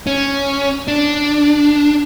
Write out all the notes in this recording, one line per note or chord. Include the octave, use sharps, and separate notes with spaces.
C#4
D4